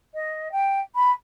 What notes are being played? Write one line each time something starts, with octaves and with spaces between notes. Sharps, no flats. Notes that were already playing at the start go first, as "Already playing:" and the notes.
D#5
G5
B5